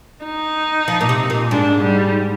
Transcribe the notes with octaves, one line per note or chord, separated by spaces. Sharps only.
D#4
F3
A#2
C3
A#2
G#2 D4
G3